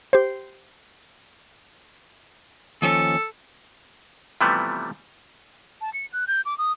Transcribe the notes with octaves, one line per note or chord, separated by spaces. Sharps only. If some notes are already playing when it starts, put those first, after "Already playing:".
G4 C5
D#2 F3 C#4 A4
C3 E3 F3 G3 A3 B3
A5
C#7
F#6
G6
D6
D#6